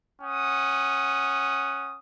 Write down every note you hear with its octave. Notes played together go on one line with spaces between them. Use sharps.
C#4 F#5 D#6